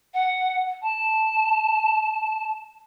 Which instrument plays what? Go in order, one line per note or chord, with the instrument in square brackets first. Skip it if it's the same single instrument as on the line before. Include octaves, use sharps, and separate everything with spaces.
[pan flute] F#5
A5